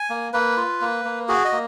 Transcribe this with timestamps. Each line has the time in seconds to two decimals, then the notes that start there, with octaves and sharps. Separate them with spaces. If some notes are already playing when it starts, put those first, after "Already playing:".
Already playing: G#5
0.10 A#3
0.33 A#3 B4
0.57 F4
0.81 A#3
1.05 A#3
1.28 F#4 G#4
1.45 D#5
1.52 A#3